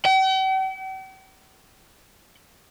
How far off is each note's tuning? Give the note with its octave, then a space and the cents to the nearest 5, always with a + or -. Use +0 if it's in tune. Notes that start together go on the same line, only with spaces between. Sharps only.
G5 -45